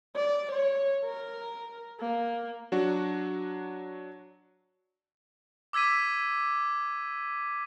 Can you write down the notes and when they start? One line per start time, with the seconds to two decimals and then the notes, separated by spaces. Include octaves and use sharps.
0.15 D5
0.52 C#5
1.04 A#4
2.00 A#3
2.72 F#3 D4 F#4
5.73 D6 E6 G#6 B6 D#7